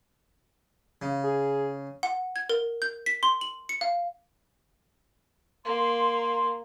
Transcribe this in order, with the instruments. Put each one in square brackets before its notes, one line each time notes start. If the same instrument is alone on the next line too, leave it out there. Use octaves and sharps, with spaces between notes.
[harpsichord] C#3
[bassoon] G#4
[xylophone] F#5
G#6
A#4
G6
B6
C6
F#7
C#7
F5
[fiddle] A#3 [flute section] C6